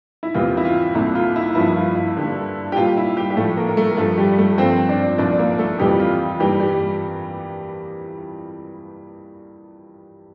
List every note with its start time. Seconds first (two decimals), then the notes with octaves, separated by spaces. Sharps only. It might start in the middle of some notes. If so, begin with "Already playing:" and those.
0.23 E4
0.34 E2 C3 E3 A#3 F4
0.57 E4
0.65 F4
0.95 C2 A#2 A3 E4
1.15 F4
1.36 E4
1.50 F4
1.55 G2 F3 A#3 E4
1.68 E4
1.76 F4
1.95 E4
2.16 G2 D3 G3 A#3
2.72 G4
2.76 A#2 G3 A#3 F4
2.97 E4
3.17 G3 G4
3.30 G4
3.36 A2 F3 A3 A4
3.57 A#3 A#4
3.68 A#4
3.77 A3 A4
3.91 A#4
3.97 G2 F3 A3 A4
4.18 G3 G4
4.38 A3 A4
4.58 G2 F3 A#3 C4 C5
4.89 D4 D5
5.18 C2 A#2 F3 A#3 D4 D5
5.39 A#3 A#4
5.59 A3 A4
5.79 F2 C3 E3 G3 A#3 G4
6.00 F4
6.40 G2 E3 G3 A#3 G4
6.60 G3 G4